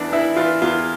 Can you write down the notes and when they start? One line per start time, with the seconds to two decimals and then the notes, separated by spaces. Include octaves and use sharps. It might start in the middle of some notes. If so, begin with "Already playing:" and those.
Already playing: E2 E3 D4
0.12 E3 E4
0.36 E3 F4
0.62 E2 F4